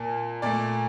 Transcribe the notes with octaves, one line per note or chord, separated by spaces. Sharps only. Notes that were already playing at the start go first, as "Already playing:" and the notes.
Already playing: A#2 A#3 A5
A#2 A3 D5